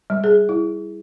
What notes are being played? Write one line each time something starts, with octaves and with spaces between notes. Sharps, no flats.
G3
G#4
E4